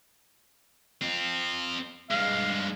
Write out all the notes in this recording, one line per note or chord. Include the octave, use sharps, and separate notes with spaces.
C4 F4
G2 G#3 F5